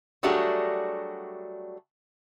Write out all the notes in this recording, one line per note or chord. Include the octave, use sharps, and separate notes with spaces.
F#3 G3 A3 D4 F#4 G#4